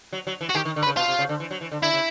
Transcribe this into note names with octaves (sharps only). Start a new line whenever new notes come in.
F#3
F#3
E3
F#4
D#3 G4
D#3
D3
B4
C#3
B2 F4
C3
C#3
D3
E3
F#3
E3
D3
D3 E4
C#3